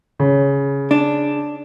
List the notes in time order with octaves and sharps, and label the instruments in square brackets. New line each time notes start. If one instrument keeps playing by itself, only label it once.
[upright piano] C#3
[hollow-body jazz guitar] D4